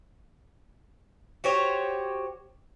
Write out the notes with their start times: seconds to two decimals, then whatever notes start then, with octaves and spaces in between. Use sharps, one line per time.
1.44 F#4 G4 C5 C#5